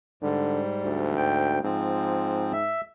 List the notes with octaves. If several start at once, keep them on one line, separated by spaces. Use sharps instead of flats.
G#2 D3 G3
D2
G#2 G5
G#2 F3 C4
E5